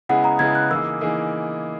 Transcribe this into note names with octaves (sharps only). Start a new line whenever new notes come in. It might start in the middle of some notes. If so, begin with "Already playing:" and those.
C#3 G#3 B3 E4 G#4 F#5
A#5
C#3 G#3 B3 E4 G#4 G#6
F#6
E3 A#3 D#4 G#4 E6
E3 A#3 D#4 G#4